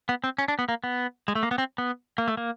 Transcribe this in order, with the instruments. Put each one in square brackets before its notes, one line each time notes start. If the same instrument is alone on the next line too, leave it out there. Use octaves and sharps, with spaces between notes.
[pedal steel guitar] B3
C4
C#4
D4
B3
A#3
B3
G#3
A3
A#3
B3
C4
B3
A#3
A3
A#3